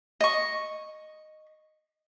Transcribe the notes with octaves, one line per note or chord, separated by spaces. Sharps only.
D#5 C#6